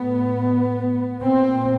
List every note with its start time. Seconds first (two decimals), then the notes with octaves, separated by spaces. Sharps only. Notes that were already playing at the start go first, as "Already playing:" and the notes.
Already playing: A2 B3
1.23 A#2 C4